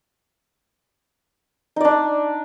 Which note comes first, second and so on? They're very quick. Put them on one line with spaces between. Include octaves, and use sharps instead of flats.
D#4 D5 D4